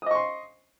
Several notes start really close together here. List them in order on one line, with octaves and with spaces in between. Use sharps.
D#6 D#5 C#6 C6